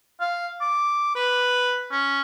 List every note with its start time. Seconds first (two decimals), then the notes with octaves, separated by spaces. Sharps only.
0.21 F5
0.61 D6
1.15 B4
1.92 C#4